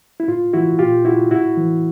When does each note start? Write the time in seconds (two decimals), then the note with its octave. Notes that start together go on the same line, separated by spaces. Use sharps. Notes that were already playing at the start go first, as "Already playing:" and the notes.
0.20 E4
0.28 A2 F4
0.53 E3 E4 F#4
0.79 A#2 F4 G4
1.05 E4 F#4
1.31 A2 E4 F#4
1.57 E3